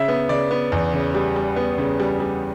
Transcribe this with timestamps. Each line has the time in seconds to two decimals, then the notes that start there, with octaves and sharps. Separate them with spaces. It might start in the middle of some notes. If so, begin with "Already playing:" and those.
Already playing: C#3 E5
0.08 B3
0.29 C#3 D5
0.51 B3
0.72 E2
0.93 C#3
1.15 G3
1.36 G3
1.56 B3
1.78 C#3
2.00 G3
2.20 G3